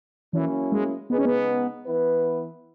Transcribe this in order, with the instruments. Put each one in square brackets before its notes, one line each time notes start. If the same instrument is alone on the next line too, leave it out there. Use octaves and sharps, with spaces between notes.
[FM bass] E3 [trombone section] F#3 A#3 C#4 E4
[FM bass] G#3
[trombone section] C#3 G#3 D#4 G#4 B4 [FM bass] B3
[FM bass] C#4
B3
[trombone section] E3 B3 E4 B4